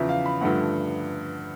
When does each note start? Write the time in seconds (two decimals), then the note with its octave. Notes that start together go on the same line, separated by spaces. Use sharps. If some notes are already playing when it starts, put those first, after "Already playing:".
Already playing: E2 C#3 F3 E5
0.09 F5
0.26 B5
0.41 G2 D3 F3 A3 F#5